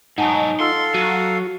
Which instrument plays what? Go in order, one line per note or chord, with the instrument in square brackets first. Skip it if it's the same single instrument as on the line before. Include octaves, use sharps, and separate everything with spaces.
[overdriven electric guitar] G#2 F#3 [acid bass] D#4 [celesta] F#5 G#5 A5
[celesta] F4 E6 [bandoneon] A4 F5 [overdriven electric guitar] C6
[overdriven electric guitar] F#3 [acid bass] F#4 [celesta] D#7